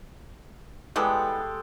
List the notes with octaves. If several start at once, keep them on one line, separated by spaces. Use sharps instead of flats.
E3 G3 G#3 B3 G4 A4